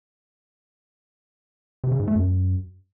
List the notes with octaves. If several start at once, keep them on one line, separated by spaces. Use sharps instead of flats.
C3
C#3
G#2
A3
F#2